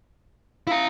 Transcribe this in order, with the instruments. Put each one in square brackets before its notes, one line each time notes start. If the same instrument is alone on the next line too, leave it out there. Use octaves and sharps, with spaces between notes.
[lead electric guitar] E4 A#5 [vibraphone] F5